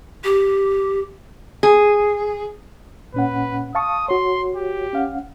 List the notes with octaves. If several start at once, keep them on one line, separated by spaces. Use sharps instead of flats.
G4
G#4
A#2 C#4 B4 F#5
F5 A5 C#6 D#6
F#4 C#5 C6
G4
C#4 F5 F#5